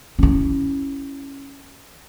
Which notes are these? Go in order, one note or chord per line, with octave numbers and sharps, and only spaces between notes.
C#4 E4